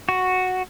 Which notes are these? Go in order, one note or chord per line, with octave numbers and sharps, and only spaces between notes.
F#4